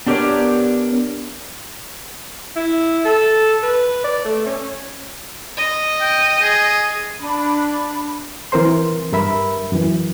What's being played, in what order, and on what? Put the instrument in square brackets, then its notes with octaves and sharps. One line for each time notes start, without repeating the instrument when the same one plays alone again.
[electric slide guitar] B3 D4 G4 A#4 C#5 D5
[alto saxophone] E4
A4
B4
D5
A3
C#4
[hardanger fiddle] D#5
[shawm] G5
G#4
[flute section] D4 B5
[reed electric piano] E3 C4 A#4 C5 C6
G2 A#4 E5 B5
F#2 E3